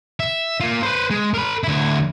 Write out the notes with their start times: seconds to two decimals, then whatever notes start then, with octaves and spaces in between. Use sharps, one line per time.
0.20 E5
0.60 A#3 F4
0.83 B4 C5
1.10 G#3
1.34 A#4 B5
1.64 D2 E4